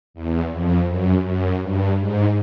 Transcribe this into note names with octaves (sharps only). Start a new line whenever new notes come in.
E2
F2
F#2
F#2
G2
G#2